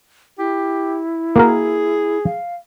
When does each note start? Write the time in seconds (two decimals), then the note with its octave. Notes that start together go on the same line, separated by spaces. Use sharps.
0.39 E4 G4
1.36 A#3 F#4 G#4 A#4
2.25 F5